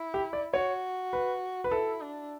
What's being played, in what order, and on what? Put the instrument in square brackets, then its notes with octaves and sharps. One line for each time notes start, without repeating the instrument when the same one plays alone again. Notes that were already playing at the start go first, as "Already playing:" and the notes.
Already playing: [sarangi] E4
[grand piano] G4
D5
[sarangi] F#4 [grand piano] C#5
[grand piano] B4
B4
[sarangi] E4 [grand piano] A4
[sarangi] D4